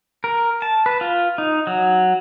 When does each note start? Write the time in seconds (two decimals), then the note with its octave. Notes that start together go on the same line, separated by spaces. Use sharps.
0.24 A#4
0.62 A5
0.86 B4
1.01 F4
1.38 D#4
1.67 F#3